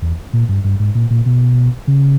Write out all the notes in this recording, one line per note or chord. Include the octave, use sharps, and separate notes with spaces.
E2
A#2
G2
G2
G#2
A#2
A#2
B2
C#3